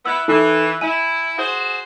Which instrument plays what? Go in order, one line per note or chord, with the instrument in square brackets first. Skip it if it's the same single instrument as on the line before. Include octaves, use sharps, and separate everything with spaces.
[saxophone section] B3 E4 [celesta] E6
[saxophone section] E3 [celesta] D#4 E4 A4
[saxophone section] E4 [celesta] G#5 D#7
[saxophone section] F#4 G#4 C5